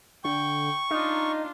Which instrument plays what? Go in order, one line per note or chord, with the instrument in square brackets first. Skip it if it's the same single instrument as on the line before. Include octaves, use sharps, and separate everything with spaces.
[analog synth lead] D3 [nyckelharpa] G5 [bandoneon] C#6
[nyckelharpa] D4 F4 [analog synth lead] D#4